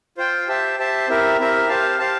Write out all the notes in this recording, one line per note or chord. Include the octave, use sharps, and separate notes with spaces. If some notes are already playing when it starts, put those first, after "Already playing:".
F4 C5 G5
G4 C5 E5 A5
G4 C5 E5 A5
C4 E4 G4 A#4 E5
C4 E4 G4 A#4 E5
G4 C5 F5 A5
G4 C5 F5 A5